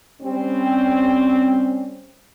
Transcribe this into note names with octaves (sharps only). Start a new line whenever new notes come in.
G3 C4 C#4